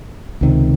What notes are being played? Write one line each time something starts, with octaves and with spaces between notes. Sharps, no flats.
C#2 C3 D#3